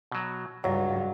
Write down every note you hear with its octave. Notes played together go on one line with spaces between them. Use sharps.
B2 F#3
C#2 G2 F#3